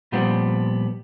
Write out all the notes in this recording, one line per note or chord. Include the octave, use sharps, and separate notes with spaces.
A#2 F3 G3 B3 C4